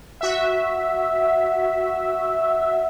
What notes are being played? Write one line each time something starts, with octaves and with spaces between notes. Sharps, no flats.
F#4 E5